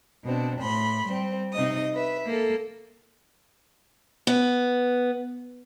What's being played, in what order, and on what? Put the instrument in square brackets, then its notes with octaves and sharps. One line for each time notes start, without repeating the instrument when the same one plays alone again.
[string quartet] B2 C4 D4
A2 B5 C6
G3 C4
C3 D#4 D#5 D#6
B4 E5
A#3 A4
[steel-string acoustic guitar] B3